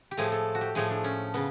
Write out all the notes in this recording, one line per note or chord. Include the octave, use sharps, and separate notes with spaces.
G4
A2 F3 A3 G#4
A4
F#4
G4
A2 F3 A3 G#4
D4
C#4
C#3 B3